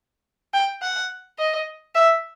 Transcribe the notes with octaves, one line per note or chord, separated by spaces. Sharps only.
G5
F#5
D#5
E5